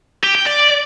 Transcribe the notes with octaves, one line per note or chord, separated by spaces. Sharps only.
G4
G5
D5